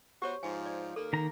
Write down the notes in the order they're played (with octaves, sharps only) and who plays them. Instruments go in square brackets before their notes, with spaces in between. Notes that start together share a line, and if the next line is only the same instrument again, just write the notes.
[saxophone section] B3 F#4 C5 [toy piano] G4 C#5
[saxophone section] G#2 F3 [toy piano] G#5
[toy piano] D5
[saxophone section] D#2 A#3 [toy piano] A4
[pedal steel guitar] D#3 A#5